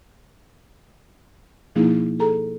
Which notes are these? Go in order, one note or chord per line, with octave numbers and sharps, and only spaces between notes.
B2 F3 A#3 D#4 E4 G#4
G#4 A4 A#5